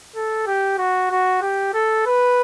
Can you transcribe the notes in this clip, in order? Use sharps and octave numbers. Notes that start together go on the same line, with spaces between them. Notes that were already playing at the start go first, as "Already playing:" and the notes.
A4
G4
F#4
F#4
G4
A4
B4